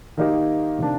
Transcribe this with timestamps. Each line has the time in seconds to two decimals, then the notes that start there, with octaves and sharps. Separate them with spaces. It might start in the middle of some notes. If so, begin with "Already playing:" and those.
0.17 D#3 A#3 D#4 G4
0.78 C3 D#3 A#3 D4